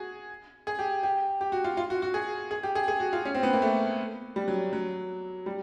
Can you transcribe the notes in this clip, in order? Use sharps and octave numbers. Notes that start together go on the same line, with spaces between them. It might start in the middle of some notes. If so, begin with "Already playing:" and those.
Already playing: F#4 G#4
G#4
G4
G4
G4
F#4
F4
F4
F#4
F#4
G#4
G#4
G4
G#4
G#4
F#4
F4
C#4
C4
B3
A#3
A3
G3
F#3
F#3
G3